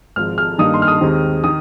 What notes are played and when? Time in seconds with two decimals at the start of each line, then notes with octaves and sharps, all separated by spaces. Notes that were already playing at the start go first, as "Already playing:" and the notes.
0.16 G#1 G#2 F3 F6
0.38 F6
0.59 G2 D#3 A#3 D#4 D#6
0.74 C6
0.82 F6
0.88 D#6
1.01 D#2 D#3 G#3 C4
1.44 D#3 D#6